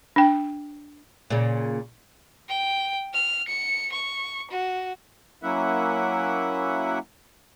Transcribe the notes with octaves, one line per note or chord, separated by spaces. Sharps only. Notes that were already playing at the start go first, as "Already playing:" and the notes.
D4 G5
A#2 C#3
G5
F6
C#7
C#6
F#4
F#3 A#3 C#4 E4 E5 F#5